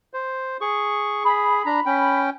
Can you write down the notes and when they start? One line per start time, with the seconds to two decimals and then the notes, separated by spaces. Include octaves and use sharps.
0.14 C5
0.61 G#4 C#6
1.25 G#4 B5
1.66 D4 A#5
1.86 C#4 G5